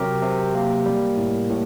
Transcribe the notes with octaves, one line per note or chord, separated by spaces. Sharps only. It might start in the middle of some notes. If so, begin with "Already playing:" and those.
Already playing: C3 F#3 G4 A#4
C3
A#3
G3
A2
A2